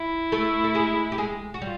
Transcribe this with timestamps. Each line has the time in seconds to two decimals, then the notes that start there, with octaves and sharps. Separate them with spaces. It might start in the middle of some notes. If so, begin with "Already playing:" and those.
Already playing: E4
0.32 A3 A4
0.64 A4
0.75 G#3 G#4
1.12 G4
1.18 G#3 G#4
1.54 F#4
1.62 G3 F4